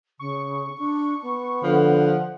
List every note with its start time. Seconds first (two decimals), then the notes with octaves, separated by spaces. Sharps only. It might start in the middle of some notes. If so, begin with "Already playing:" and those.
0.19 C#3 C#6
0.78 D4
1.22 B3
1.63 D3 F3 F#5